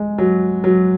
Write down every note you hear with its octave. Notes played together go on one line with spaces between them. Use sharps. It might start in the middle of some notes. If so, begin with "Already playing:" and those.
Already playing: G#3
F#3
F#3